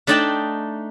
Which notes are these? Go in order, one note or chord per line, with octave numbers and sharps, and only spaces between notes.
A3 D4 D#4 D5 G5 A5